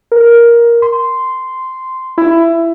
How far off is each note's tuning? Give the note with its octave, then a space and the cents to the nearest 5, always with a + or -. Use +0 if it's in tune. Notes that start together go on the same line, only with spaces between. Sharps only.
A#4 +10
C6 -10
E4 +15